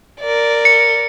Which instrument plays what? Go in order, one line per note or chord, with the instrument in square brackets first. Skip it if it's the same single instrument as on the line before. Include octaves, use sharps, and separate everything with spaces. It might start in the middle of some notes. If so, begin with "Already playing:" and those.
[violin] A#4 D5
[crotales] C#7